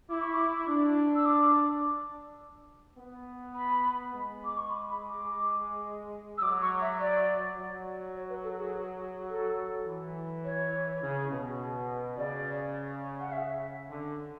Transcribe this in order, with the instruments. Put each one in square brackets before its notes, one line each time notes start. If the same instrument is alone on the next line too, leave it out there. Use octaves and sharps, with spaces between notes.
[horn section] E4 [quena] D6
[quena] C#6
D6
[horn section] D4
[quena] E6
D6
[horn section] B3
[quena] B5
[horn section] G#3
[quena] D6
C#6
B5
B5
D6
E6
[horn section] F#3 [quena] D6
[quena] C#6
E5
D5
[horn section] F#3
[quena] C#5
B4
A4
G#4
A4
[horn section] E3
[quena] C#5
[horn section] C#3
B2
[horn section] C#3 [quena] D5
[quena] F#5
E5
[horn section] D3